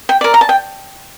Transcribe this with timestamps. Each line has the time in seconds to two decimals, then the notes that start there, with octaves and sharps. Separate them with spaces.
0.09 G5
0.21 A#4 D5
0.34 A#5
0.41 A5
0.49 G5